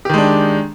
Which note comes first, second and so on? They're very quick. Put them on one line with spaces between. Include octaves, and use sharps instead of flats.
G4 D#3 G#3 D4